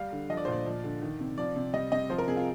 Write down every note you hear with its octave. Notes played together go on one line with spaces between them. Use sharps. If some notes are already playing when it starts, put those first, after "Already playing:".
Already playing: G3 F5
D3
F3 D#5
D5
C5
A#2 D5
F3
D3
D#3
C3
F3 D5
C3
G3 D#5
C3 D#5
F3 C5
A#4
C3 G#4
F4